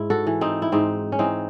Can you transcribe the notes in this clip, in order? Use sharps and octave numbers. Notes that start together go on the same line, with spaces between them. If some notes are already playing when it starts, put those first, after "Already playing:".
Already playing: G#2 E4
F#4 A4
E3
C4 D#4
E4
G#2 C4 D#4
C#4
E3 C4 D#4